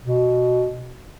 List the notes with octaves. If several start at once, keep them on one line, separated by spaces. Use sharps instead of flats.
B2